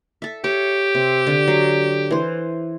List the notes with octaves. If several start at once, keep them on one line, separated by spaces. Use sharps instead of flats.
A4 E5
G4 C#5
C3
D3
F#3
E3 C5